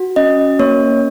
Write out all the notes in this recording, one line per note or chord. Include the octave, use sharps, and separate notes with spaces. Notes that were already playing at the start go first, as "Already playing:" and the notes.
Already playing: F#4
C#4 D#5
A#3 C#5